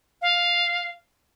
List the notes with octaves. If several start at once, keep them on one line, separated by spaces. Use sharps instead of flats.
F5